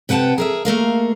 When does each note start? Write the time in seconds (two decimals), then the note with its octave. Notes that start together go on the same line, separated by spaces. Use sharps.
0.09 C3 B4 F#5 G5 A5
0.38 G#4 A#4 E5
0.65 A3 A#3 A#4 F5